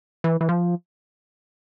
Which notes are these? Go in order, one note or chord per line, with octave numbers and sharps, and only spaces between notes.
E3
E3
F3